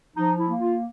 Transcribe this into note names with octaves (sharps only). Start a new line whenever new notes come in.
F3 D#4
E4
A#3
F4